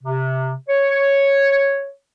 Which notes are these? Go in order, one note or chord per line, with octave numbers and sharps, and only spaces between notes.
C3
C#5